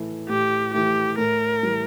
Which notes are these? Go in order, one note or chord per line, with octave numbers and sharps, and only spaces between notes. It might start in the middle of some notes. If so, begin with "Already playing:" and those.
Already playing: A2 E3 A3
A2 G4
E3 A3 G4
A2 A#4
E3 G3